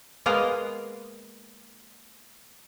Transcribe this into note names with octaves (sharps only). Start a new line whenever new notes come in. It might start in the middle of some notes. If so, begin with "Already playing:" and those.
G#3 A#3 B3 A#4 D#5 F5